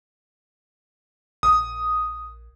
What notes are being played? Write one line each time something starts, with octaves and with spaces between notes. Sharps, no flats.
A#1 D#6